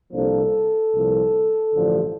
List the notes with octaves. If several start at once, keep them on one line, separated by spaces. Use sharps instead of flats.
C2 A#2 F3 A#3 D4 A4
C2 A#2 F3
A1 G2 D3 F3